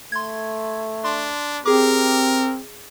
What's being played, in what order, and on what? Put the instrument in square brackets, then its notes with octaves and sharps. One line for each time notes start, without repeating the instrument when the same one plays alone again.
[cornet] A3 [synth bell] C6 G#6
[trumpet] D4 [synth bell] C6
[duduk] C4 [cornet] G4 [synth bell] G#4 D6 [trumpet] A#4